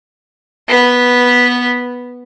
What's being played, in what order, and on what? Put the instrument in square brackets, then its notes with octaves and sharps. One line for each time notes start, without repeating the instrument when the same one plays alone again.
[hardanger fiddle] B3 B4